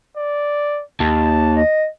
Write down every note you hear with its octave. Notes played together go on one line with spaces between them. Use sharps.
D5
D#2 A5
D#5